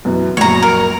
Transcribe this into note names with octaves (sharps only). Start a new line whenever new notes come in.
F#2 B2 E3
A#1 F#2 C#5 A#5
A#4